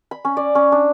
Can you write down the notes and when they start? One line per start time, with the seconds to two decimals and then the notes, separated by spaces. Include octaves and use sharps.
0.11 B5
0.25 C#4
0.37 D5
0.55 C#4
0.72 D4